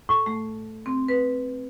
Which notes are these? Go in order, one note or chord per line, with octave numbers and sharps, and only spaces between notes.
A2
A3
C4
B4